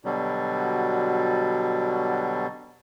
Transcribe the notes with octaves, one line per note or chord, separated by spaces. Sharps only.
B2 D3 F#3 G3